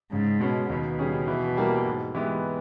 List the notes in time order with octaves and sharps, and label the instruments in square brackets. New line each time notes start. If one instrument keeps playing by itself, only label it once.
[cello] G#2 [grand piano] C#3
[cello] B2 [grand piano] G#3 C#4
[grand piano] D#2 [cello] B2
[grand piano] C#3 G3 C#4 G#4
E3
G3 A#3 E4 A#4
G#2
E3 G#3 B3 G4